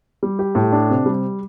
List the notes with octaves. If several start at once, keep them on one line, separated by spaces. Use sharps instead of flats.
G3
G4
A2
D4
C3
G3